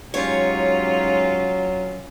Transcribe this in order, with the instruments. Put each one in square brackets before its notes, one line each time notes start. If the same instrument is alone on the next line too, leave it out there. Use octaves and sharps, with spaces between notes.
[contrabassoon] G#2 [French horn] F#3 [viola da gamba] C#4 F4 [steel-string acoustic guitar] G4 C#5